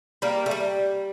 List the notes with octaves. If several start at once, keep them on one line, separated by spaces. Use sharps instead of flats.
G3 A#3
A3
G3